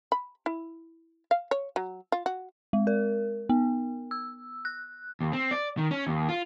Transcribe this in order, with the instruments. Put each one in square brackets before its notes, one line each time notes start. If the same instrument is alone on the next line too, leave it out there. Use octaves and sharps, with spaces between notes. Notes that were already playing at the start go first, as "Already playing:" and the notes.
[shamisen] B5
E4
F5
C#5
F#3
F4
F#4
[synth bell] G#3
A#4
B3
E6
F#6
[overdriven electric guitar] D#2
C4
D5
D#3
C#4
D#2
F4